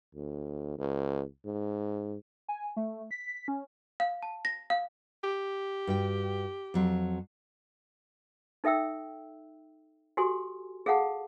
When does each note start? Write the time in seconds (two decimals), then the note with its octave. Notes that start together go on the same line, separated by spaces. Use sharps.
0.15 D2
0.78 C#2
1.45 G#2
2.48 G#5
2.77 A3
3.11 B6
3.48 C#4
4.00 F5
4.23 A5
4.45 A#6
4.70 F5
5.24 G4
5.87 G2 F#4 G5
6.74 F2 F#3 C4
8.64 D#4 A4 E5 G5 E6
10.17 F#4 G4 A4 G#5 C6
10.86 G#4 A4 F5 F#5 A5